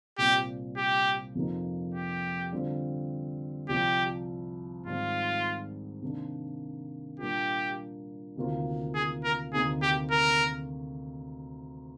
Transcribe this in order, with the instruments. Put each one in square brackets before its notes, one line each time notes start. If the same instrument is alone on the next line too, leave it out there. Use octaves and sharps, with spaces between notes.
[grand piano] C2 A#2 G3 C4 [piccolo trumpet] G4
[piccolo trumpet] G4
[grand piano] F2 C3 F3 A#3 D#4
[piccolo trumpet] G4
[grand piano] D3 G3 C4 F4
[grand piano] C2 C3 F3 [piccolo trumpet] G4
[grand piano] G#2 D#3 G3 C4 [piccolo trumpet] F4
[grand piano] C3 D#3 A#3 D4
[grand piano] A#2 G3 A#3 D4 F4 [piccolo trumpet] G4
[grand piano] D2 C3 D#3 A#3 F4
[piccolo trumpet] G#4
A#4
[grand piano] D2 C3 D#3 A#3 D#4 [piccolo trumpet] G#4
[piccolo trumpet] G4
A#4